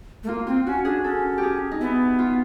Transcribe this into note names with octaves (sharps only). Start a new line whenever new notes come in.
A3
A#3 F4
C4 F4
C#4 F#4
D4 G#4
C#4 A4
G4
G#4
D#4
B3 E4
F4